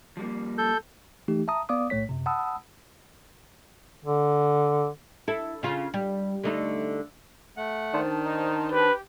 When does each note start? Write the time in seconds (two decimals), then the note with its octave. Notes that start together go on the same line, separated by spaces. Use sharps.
0.17 F3 G3 A#3
0.58 A4 G6
1.28 E3 A3 D#4 G4
1.48 E5 A5 A#5 D#6
1.69 B3 D5 F5 D6 D#6
1.90 B1 A2 A3 C#5 B6
2.09 F#2 C3
2.26 F#5 A5 B5 D#6 E6
4.05 D3
5.28 E4 A4
5.63 C#3 F4
5.94 G3
6.44 D3 A3 D#4
7.57 A3 F#5
7.94 D#3 D4 C5 A5
8.25 D#4
8.72 G4 B4